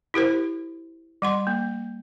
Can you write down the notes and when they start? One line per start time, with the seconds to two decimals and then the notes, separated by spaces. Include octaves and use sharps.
0.14 E4 G4 A#4 C5
1.22 G3 F#5 C6
1.47 A#3